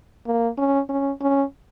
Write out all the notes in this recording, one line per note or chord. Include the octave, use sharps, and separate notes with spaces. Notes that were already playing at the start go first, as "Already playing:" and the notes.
A#3
C#4
C#4
C#4